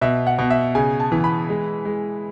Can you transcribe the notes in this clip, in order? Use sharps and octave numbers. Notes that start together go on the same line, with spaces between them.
B2 E5
F#5
B2
E5
C#3 G#5
A5
E3
B5
G#3
G#3